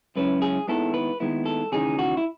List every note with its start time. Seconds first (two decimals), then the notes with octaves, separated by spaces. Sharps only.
0.16 F#2 C#3 G#3 C#4 E4 B4
0.42 G#4
0.68 D#2 D#3 G#3 B3 E4 A4
0.94 B4
1.20 D#2 D#3 G#3 B3 E4
1.46 A4
1.72 D#2 C#3 E3 G#3 D#4 G#4
1.99 F#4
2.17 E4